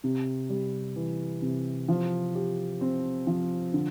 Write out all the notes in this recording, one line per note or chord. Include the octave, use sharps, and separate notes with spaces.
C3
G3
E3
C3
F3
G4
C4
F3
D3